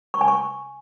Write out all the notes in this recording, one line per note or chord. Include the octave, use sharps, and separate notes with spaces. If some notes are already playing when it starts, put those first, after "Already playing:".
C#6
G#5
C#6